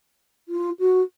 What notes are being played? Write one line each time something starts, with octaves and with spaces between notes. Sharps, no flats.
F4
F#4